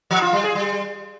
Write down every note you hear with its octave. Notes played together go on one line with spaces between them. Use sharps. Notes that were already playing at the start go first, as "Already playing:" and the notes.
F3
F4
G3
G#4
G3